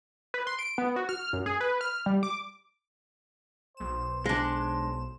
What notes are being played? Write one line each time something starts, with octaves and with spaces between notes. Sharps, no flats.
B4
C6
D7
B3
F#4
F6
F#2
G#4
B4
F6
G3
D6
B1 C5 E7
G#3 D4 C5